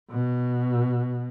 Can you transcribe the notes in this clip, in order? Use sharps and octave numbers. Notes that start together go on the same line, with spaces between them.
B2